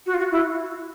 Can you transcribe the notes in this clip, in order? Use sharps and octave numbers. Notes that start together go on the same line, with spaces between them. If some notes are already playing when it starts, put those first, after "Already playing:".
F#4
F4
F#4
E4